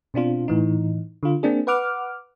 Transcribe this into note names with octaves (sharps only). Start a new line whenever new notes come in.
B2 C4 D4 F4
A2 E3 D#4
D3 F4
A#3 C4 D4 G#4
B4 F#5 D6 F6